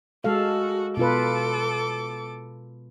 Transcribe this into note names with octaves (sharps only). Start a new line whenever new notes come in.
G#3 F#4 A4 F5
B2 F4 A4 B4 D6